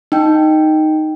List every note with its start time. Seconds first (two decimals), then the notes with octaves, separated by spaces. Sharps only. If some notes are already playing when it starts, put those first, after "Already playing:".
0.12 D#4 G5